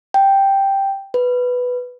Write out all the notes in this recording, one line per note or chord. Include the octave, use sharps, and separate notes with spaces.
G5
B4